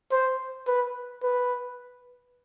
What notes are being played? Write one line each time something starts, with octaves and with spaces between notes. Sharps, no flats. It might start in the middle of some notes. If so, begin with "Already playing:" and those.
C5
B4
B4